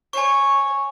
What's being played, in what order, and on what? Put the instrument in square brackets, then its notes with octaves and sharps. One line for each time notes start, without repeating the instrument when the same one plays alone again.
[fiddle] C#5 [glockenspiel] G#5 C#6